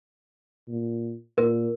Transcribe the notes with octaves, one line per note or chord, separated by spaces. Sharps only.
A#2
A#2 A#4